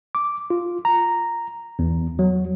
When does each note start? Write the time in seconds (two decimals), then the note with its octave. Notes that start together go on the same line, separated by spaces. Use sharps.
0.15 D6
0.50 F4
0.85 A#5
1.79 E2
2.19 F#3